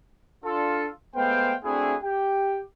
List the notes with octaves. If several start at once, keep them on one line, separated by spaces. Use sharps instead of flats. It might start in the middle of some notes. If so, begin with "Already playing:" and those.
D4 F4 A4
G#3 A3 B3 C5 F5 G5
A3 C4 D4 E4 F#4 G#4
G4 G5